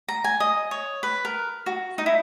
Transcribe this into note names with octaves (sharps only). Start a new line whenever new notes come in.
A#5
G#5
D#5
C#5
B4
A#4
F#4
D#4
E4